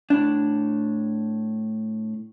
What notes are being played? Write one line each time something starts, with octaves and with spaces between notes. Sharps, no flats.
A2 D4